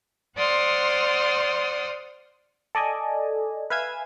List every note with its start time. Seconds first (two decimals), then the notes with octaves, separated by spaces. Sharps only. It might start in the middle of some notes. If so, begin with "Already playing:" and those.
0.37 C5 D5 F#5 C6 D#6 F6
2.75 A4 D5 D#5 G#5
3.70 B4 E5 F5 G#5 E6 G#6